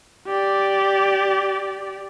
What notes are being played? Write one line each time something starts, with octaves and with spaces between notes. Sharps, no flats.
G4 D5